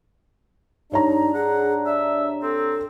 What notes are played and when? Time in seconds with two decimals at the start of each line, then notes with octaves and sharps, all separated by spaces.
0.92 G2 D4 D#4 C#5 A#5
1.34 G#4 F#5
1.86 D5 E5
2.43 C4 A4